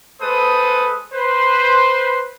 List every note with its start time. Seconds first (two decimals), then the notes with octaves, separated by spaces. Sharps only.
0.21 G#3 A4 B4 C5 D#6
1.13 B4 C5